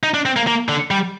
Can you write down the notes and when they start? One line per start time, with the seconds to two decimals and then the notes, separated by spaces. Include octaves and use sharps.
0.03 D#4
0.14 D4
0.25 C4
0.36 A#3
0.47 A#3
0.69 D3
0.91 G3